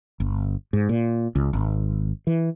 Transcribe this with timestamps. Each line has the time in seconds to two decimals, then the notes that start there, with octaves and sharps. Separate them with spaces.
0.20 G1
0.73 G#2
0.89 A#2
1.35 C#2
1.53 G#1
2.27 E3